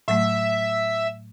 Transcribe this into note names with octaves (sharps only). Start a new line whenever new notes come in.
A2 F#3 A3 E5